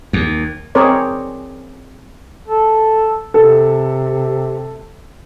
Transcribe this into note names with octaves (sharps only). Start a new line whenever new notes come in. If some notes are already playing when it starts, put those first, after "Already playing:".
D#2
C4 G#4 A#4 C#5 D5
A4
C3 A4